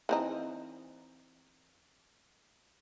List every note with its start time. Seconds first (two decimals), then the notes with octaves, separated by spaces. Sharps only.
0.09 E3 C4 D#4